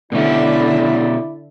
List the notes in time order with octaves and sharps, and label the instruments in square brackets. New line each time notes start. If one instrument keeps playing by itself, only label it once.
[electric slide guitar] B2 C#4 [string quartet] D3 E5 [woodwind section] E4 D5